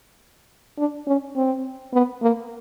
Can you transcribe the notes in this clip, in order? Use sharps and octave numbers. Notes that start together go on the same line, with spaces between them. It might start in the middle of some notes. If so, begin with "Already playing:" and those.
D4
C#4
C4
B3
A#3